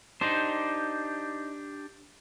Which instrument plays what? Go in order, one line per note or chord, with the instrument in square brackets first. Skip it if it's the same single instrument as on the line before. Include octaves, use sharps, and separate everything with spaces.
[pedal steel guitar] D4 G4 [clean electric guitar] D#4 C5